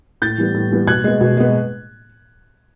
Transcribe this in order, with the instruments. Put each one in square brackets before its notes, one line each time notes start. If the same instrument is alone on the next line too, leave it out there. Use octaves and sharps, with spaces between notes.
[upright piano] A2 G6 A6
E3 G3 B3
A2
E3 G3 B3
B2 F#6 G#6
G#3 B3
B2
G#3 B3